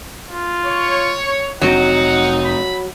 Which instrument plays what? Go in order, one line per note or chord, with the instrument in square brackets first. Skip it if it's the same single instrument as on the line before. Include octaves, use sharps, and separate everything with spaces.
[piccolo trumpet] F4
[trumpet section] C#5
[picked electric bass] F1 C4 [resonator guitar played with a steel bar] F#3 [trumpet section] D#4 [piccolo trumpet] F#5
[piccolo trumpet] B5